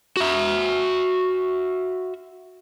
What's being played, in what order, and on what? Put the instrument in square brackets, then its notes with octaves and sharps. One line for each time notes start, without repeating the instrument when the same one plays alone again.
[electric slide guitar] F#4 E5